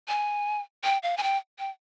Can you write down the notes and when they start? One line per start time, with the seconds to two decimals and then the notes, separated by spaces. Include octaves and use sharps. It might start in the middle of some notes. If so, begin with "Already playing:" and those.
0.08 G#5
0.84 G5
1.03 F5
1.17 G#5
1.23 G5
1.59 G5